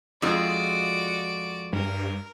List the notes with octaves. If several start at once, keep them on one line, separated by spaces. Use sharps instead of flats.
F2 G#3 F4 F#4 D5
G2 A#4